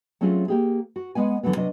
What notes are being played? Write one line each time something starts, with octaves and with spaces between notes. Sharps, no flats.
F#3 A3 C4 C#4 F4 G#4
A#3 G4 G#4
F#4
G#3 B3 F#5 G#5
D3 E3 F#3 A3 B3
C3 F#3 D4 D#5